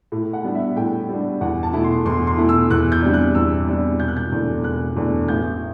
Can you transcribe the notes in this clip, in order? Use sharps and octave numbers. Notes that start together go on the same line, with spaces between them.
A2
F#5
G3 B3 D4
E5
A2 G5
G3 B3 D4
E2 F#5
A5
B2 A3 E4
C6
E2 C6
C6
B2 A3 E4
E6
E2 F#6
G6
C3 G3 D4
F#6
E2 E6
C3 G3 D4
E1 G6
F#6
G6
E2 D3 A3 D4
E1 F#6
E2 D3 A3 D4
A1 G6